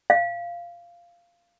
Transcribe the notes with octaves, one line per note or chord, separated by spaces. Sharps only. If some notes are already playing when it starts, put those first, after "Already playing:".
F5